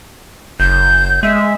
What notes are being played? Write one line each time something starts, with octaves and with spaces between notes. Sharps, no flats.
F#1 G6
G#3 E5